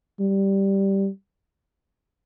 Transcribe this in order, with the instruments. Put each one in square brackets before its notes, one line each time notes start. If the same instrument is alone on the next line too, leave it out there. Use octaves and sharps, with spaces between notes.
[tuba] G3